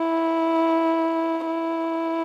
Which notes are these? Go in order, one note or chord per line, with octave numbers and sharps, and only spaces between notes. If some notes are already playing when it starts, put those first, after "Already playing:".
Already playing: E4
E4